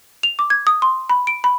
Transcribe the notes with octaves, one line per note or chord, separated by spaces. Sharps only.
F7
D6
G#6
D#6
C6
B5
D7
B5